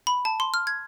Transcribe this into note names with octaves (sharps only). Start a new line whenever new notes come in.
B5
A5
C6
F6
G#6